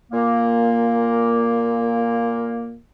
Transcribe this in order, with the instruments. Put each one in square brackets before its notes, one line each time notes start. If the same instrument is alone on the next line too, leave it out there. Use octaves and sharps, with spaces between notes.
[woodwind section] A#2 A#3